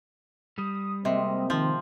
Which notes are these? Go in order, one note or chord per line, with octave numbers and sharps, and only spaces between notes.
G3 D#6
C3 G#3 A#3 C4 D#5
D#3 F3